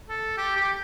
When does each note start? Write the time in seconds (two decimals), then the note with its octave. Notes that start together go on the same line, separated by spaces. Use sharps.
0.09 A4
0.37 G4
0.56 G4